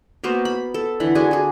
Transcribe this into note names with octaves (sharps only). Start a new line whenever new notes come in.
A#3 B3 F#4 C5
B5
A4
D3 E3 F#5 B5
D4 F#4 G#4 G#5
F#4 G#4